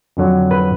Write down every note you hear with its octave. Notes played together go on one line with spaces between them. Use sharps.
F2 D3 F#3
B4